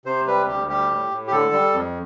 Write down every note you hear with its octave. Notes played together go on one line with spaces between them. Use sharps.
C3 C5
G3 B4
D2 G4
G3 G4
A2
A2
G4
D3 A4
G3
F2